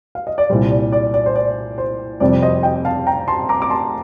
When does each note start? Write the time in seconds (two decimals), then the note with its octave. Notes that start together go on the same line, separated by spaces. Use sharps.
0.15 F5
0.27 D#5
0.38 D5
0.50 C2 A#2 G3 C5
0.71 D5
0.92 D5
1.14 D5
1.26 C5
1.36 D5
1.78 C5
2.20 F2 C3 G3 D5
2.42 C5 D#5
2.63 D#5 G5
2.85 F5 A5
3.07 G5 A#5
3.28 A5 C6
3.49 A#5 D6
3.62 D6
3.70 A5 C6